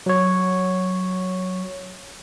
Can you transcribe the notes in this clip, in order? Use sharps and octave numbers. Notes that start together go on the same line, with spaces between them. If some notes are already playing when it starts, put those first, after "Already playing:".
F#3 C#5